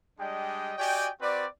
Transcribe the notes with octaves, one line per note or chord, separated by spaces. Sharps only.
G3 G#3 D4 D#5 G5
F#4 G4 D5 D#5 G5 G#5
C4 F#4 B4 D5